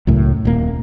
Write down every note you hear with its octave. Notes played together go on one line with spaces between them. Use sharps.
C#2 F#2 A2
D#1 A#3